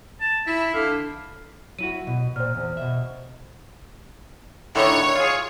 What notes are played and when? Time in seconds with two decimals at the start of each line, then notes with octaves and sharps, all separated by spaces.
0.21 A5
0.47 E4 E5
0.74 D3 F5
1.79 F#3 E4 F#4 D#7
2.07 B2
2.36 A#2 C5 F6
2.55 E2
2.77 B2 E5
4.76 A2 D3 D#3 C#5
5.15 F4 G#4